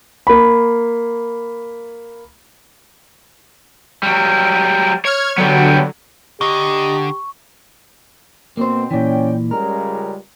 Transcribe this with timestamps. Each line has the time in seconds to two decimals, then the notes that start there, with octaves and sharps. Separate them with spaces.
0.27 A#3 B5
4.03 F#3 G3
5.05 C#5 F6 G#6
5.38 D3 F#3 G3 B3
6.41 D3 G4 D#5 A#5 C#6
8.57 B2 A#3 C4 C5
8.91 A#2 E3 C#4 D5 G5
9.51 C#2 G3 G#3 A#4